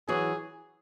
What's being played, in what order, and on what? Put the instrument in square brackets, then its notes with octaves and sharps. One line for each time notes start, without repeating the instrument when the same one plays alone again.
[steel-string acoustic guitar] E3 F#3 [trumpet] G#4